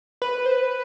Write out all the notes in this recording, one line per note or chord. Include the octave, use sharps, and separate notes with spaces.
B4
C5
B4